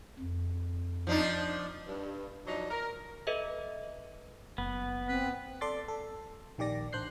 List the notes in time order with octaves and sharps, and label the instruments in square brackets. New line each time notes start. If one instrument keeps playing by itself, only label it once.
[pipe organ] F2
[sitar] F3 D4 D#4
[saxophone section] G2
F3 F#3 D4 D#4
A#4
[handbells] A4 B4 D#5 E5
[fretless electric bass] F#1 [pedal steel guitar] B3
[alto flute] C4 [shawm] B4
[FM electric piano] A4 D5 C6 D6 A6
A4
A#1 D#3 G4 D5 A#6
A1 D4 C5 F#6 G6 C7